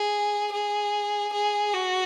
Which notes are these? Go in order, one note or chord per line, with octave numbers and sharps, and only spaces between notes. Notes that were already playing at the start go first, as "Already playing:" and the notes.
Already playing: G#4
G#4
G#4
F#4